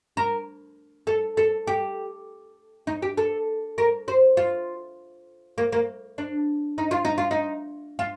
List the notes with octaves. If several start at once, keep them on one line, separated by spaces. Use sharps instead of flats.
A#4
A4
A4
G4
D#4
G4
A4
A#4
C5
F4
A#3
A#3
D4
D#4
F4
D#4
F4
D#4
F4